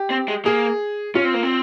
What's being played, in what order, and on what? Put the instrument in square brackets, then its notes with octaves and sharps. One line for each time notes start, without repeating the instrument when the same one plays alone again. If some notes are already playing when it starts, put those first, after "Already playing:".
Already playing: [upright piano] G4
[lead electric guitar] C4
G#3
[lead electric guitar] A#3 [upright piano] G#4
[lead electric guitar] C#4 [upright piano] F4
[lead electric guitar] C4
A#3
C4